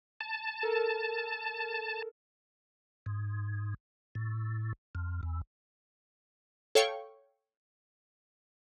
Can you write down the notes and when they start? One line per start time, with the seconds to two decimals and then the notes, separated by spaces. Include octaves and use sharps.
0.21 A5
0.63 A4 A#4
3.06 G#2
4.15 A2
4.95 F2
5.23 E2
6.75 A4 C#5 F5 G5 C#6